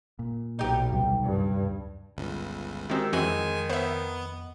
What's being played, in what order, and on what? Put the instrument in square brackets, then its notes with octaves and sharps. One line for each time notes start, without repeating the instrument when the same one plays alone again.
[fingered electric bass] A#2
[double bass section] B1 [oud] D#4 G4
[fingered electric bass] D2 C3 G3
[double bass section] G2
[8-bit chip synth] G1 C#2
[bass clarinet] D#3 [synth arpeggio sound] G#3 C4 [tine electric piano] F#4 G4 E6
[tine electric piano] F2 D#5 [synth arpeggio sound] E3 C4 F#4 [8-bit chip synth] G#3 G#5
[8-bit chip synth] B3 [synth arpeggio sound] C5 E5